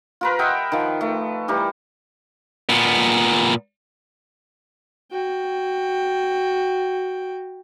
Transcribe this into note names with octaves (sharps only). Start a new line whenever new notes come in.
F4 A#4 B4
D#5 E5 F#5 G5
D#3 F3
A3
E3 G3 G4 A#4
A#2 B3
F#4 G5